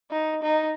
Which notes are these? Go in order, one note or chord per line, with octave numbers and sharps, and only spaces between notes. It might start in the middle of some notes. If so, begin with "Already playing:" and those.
D#4
D#4